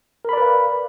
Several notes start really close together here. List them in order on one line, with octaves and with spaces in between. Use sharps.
A#4 B5 D5 B4 F5